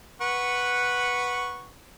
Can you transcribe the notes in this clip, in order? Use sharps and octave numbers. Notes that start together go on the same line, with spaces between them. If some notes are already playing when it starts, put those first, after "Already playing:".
B4 F#5 C#6